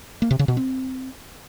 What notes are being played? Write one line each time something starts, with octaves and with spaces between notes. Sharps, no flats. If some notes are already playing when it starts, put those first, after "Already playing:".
A#3
C3
C#3
B2
C4